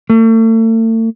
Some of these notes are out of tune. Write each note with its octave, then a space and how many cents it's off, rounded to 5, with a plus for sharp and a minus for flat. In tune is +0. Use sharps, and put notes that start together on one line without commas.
A3 +40